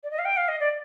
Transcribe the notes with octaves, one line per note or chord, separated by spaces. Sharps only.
D5
D#5
F5
G5
F5
D#5
D5